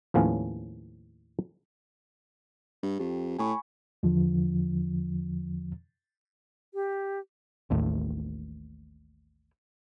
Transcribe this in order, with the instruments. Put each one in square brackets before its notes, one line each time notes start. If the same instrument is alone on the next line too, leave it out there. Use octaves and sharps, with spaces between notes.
[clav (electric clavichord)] D#2 A2 F3 B3 C#4
[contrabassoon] G2
[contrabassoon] F2 [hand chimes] G4
[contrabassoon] A2 [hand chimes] G#5 B5 C#6
[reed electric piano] E2 D3 F3
[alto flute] G4
[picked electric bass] A1 D#2 A2